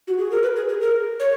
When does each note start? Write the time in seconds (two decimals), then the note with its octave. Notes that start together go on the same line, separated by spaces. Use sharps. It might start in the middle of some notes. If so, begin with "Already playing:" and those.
0.08 F#4
0.18 G#4
0.31 A#4
0.43 B4
0.56 G#4
0.69 G#4
0.81 A#4
1.20 C#5